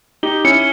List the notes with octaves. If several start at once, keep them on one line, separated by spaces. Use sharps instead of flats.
D#4 G4 G7
C#4 E4 C#7